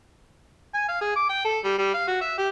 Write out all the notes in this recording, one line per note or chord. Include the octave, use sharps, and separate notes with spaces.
G#5
F5
G#4
D6
G5
A4
G3
G3
F5
F#4
E5
G4